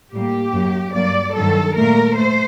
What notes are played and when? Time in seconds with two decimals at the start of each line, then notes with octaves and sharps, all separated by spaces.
0.13 A2 G3 A#3 G4
0.54 F#2 F#3 A#3
0.95 G2 F#3 A#3 D5
1.35 G2 D#3 F#3 A4
1.76 A#2 A3 A#4
2.17 A3 C5